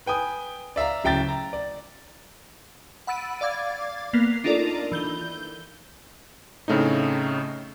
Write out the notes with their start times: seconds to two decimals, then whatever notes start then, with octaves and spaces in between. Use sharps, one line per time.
0.06 B4 G5 G#5 D#6
0.76 D5 E5 F5 A#5
1.04 D1 C#3 E5 G5 A#5 A6
1.28 A#5
1.53 D5
3.07 F#5 B5 E6 A6 D7 D#7
3.41 D5 F5 D6 G#6 A6
4.13 A#3 B3 C7 F7
4.44 D4 D#4 F4 A4 A#4 D5
4.92 E3 G6 G7
6.68 A2 C#3 A3 C4 D#4